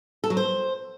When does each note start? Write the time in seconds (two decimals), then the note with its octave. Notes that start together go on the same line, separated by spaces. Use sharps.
0.24 A4
0.30 F#3
0.37 C5